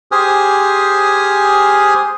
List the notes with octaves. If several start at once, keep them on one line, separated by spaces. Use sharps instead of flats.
G4 G#4 C5 G#5 D#6 F6